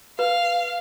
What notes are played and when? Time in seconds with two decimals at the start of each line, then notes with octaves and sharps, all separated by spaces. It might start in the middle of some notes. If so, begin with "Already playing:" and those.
0.19 B4 F5